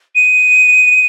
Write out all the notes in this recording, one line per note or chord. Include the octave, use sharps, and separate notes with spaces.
D#7